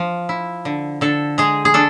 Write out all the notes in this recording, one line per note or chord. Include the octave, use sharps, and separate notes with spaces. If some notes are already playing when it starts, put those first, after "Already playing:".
Already playing: F3
E4
D3
D3 A4
G#3 G#4
G#4
D4 A4